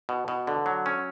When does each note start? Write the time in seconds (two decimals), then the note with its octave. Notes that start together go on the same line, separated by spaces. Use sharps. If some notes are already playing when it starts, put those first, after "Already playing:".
0.09 B2
0.28 B2
0.47 D3
0.66 F#3
0.86 C#4